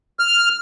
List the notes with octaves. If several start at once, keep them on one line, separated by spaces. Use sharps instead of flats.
F6